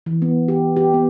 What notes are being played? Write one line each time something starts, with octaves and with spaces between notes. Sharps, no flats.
E3
B3
G4
G4
B3